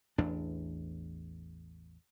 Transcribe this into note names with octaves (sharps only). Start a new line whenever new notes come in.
A1 E2 D4